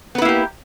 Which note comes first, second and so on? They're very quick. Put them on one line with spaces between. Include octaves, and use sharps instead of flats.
B3 B4 E4 A#3 G4